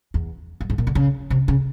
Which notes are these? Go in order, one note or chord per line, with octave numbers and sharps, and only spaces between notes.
E2
F#2
G#2
A#2
D3
C#3
C3
C#3